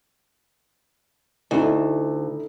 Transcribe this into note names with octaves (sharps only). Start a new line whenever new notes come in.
D2 D#4 E4